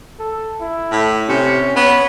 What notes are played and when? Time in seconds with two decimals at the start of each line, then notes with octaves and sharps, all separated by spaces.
0.19 A4
0.61 E4
0.92 A2
1.29 C3 C#4
1.76 B3 C#5